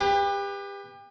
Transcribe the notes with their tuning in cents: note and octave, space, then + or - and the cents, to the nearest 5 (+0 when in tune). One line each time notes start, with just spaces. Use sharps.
G4 +30 B4 +0